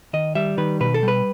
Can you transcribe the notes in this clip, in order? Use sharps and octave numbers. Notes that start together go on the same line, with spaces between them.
D#3 D#5
G3 E5
D#3 B4
B2 B4
A4
G3
B4